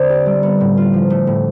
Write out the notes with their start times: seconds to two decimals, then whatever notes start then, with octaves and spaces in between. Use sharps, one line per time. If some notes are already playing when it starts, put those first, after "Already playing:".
Already playing: D3 C4
0.10 G4
0.26 G3
0.43 B3
0.60 A2
0.77 F4
0.93 F3
1.10 A3
1.27 A2